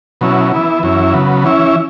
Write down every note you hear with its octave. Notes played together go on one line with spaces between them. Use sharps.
B2 F#3 C#4 E4
E3 B3 E4
F#2 E3 C#4 E4
C#3 F#3 B3
E3 C#4 E4